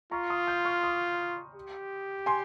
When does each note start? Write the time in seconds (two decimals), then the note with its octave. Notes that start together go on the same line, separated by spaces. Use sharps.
0.11 F4 A#5 C#6
0.30 C6 D#6
0.47 D#6 G6
0.65 C#6 F6
0.83 C6 D#6
1.55 G4
2.26 G#5 C6